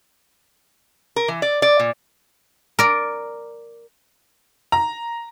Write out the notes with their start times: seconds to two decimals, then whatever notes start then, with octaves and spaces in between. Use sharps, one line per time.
1.16 A#4
1.28 E3
1.42 D5
1.62 D5
1.79 A#2
2.79 A#4 D5
4.72 A#5